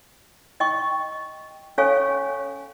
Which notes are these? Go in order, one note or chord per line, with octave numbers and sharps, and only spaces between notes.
D#5 G5 C#6
C#4 A4 C#5 F5 G#5 C#6